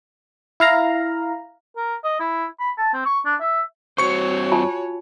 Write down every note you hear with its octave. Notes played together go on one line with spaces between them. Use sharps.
E4 F5 A#5
A#4
D#5
E4
B5
A5
C4
C#6
D4
E5
G2 C4 F#4 C5 C#5 C#6 C#7
F4 G#5 A5